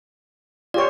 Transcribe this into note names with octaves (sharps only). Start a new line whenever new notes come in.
F4 G4 C#5 D5 D6